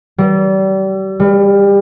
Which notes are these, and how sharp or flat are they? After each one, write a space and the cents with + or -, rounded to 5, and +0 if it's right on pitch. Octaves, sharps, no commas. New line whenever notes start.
G3 -35
G3 +30